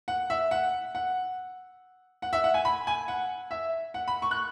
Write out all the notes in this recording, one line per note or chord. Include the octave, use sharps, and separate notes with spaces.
F#5
E5
F#5
F#5
F#5
E5
F#5
G#5
B5
G#5
F#5
E5
F#5
B5
C#6
F#6